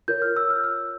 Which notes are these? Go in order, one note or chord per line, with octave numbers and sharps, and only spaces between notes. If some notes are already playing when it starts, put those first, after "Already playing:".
F4 A#4 C#5 G6
F6
E6
F6
F6